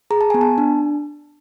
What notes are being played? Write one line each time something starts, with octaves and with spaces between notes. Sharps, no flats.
G#4 A#5
A5
B3 G#5
A5
D4